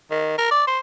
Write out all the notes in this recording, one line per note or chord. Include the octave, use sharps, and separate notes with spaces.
D#3
A#4
D5
C5